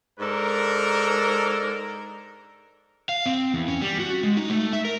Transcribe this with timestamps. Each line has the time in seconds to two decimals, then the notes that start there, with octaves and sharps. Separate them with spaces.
0.20 G#2 D4 A4 A#4
3.09 F5
3.26 C4
3.54 E2
3.68 C#4
3.81 G3
4.00 F#4
4.23 G#3
4.37 D#4
4.50 A3
4.73 E5
4.85 A#4